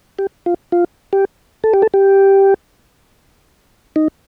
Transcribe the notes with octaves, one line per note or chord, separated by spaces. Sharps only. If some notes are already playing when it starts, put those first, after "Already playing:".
G4
F4
F4
G4
A4
G4
A4
G4
D#4